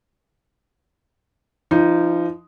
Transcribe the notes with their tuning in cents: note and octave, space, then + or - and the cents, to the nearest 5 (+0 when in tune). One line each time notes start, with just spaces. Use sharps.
F3 -25 D#4 +0